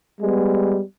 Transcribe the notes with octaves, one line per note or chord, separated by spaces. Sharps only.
G3 G#3 B3